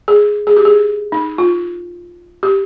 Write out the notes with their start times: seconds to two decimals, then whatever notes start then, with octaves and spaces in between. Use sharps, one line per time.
0.08 G#4
0.47 G#4
0.57 G4
0.65 G#4
1.12 D#4
1.38 F4
2.43 G4